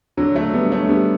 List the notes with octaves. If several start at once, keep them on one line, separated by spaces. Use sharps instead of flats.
D3 F#3
F#3 A3
G3 B3
A3 C#4
G3 B3